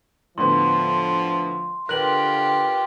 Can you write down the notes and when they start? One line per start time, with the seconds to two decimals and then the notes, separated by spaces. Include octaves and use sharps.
0.38 A2 D3 F3 B3 C6
1.89 D3 F4 G4 A#4 B4 F#6 F#7